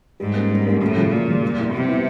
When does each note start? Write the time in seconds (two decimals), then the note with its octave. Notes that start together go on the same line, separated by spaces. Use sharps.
0.20 G#2 G3
0.35 A#3 C#4
0.51 G3
0.66 A#3 C#4
0.82 F#2 A2
0.96 C#3 F3
1.12 F#2 A#2
1.28 C#3 F3
1.42 G3
1.58 B3 E4
1.73 C3 G3
1.88 B3 E4